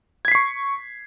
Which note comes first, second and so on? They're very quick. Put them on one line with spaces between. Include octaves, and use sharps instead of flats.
G#6 B6 C7 C#6